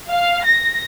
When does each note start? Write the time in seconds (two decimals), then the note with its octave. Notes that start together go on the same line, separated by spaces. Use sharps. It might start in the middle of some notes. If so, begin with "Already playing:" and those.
0.10 F5
0.45 A#6